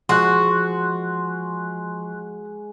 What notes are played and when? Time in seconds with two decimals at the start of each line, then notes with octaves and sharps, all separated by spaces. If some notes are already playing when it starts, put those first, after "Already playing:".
0.09 F3 G#3 F#4 C6 F#6